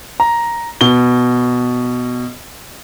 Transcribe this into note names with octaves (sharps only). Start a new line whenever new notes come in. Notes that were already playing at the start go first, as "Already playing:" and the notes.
A#5
B2 G7